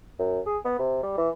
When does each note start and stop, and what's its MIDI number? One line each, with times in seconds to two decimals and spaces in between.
0.19 0.40 42
0.47 0.58 68
0.65 0.77 59
0.79 0.99 48
1.03 1.14 55
1.18 1.29 52